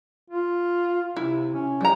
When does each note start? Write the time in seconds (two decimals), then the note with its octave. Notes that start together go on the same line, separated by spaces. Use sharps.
0.30 F4
1.16 C3 E4
1.54 C#4
1.81 G3 A#5